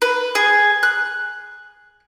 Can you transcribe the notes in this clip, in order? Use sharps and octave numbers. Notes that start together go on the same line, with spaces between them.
B4
G#4
F#6